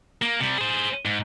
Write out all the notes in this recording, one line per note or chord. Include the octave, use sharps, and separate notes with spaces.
A#3
C3 G3
G#4 C5
G#2